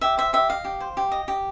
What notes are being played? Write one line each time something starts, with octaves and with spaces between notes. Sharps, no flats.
G4 E5
C5 E5
G4 E5
D#5 F5
G4
C5
G4
D#5
G4